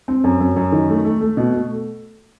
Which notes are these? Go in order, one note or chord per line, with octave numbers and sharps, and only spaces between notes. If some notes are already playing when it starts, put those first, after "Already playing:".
C4
F#2
F#2
F#2
D#3
A3
A3
A3
B2
A3